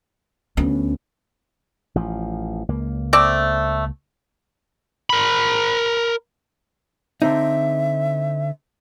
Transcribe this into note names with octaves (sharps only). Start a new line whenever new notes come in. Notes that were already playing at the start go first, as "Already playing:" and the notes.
D2 B3 C#4
A1 F3
C#2 A#3
A3 C4 D5
A#4 B5
D3 C4 D#4 E5